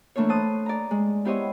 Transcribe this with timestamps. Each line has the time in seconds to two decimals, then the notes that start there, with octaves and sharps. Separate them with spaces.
0.16 E3 A3 A#3 D4 C#5
0.29 C5 A5 D#6 F#6
0.66 D5 A#5
0.91 G#3
1.25 B3 E4 G4 C5 C#5 D#5